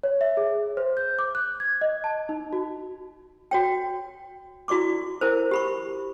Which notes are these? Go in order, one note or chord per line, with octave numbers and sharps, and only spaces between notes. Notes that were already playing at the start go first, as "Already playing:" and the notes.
C#5
E5
G#4
C5
G6
D6
F#6
G#6
D#5
A5
D#4
F#4
F#4 C#5 G5
E4 F#4 D5 C#6 D6
E4 A#4 C5
G4 B5 C#6